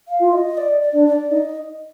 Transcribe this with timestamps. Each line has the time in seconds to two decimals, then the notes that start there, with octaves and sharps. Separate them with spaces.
0.08 F5
0.20 F4
0.33 D#5
0.57 D5
0.82 D5
0.93 D4
1.06 D5
1.31 D#4 D#5